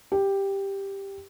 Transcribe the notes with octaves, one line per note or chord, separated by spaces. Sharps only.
G4